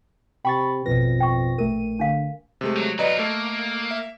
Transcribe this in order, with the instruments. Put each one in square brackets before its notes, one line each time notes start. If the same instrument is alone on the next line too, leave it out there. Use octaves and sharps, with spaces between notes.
[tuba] C3 [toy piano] G5 [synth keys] B5 C#6 A6
[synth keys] A1 B2 A#6 [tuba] F2 [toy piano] B4
[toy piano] G5 C#6
[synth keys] A#1 A3 D#7 [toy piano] A#4
[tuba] D3 [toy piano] D4 F5
[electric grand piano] C3 G#3 A3
[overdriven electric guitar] F#3
[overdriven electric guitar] F#3 F4 [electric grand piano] B4 D5 A#5 [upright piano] D#5
[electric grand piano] A3 A4 [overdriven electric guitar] A#3
[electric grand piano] E5